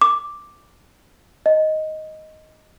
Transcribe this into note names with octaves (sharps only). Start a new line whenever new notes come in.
D6
D#5